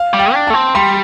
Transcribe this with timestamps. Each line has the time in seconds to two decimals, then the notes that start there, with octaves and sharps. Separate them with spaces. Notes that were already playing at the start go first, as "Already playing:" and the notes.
Already playing: F5
0.13 G3
0.19 G5
0.34 D4
0.47 A3 A5
0.54 C4
0.75 G3 C6